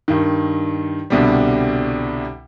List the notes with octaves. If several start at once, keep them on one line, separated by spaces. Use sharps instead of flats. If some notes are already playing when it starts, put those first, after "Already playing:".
G2 D#3
C2 B2 D3 G3